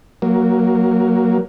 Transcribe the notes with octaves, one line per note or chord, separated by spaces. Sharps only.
F#3 A#3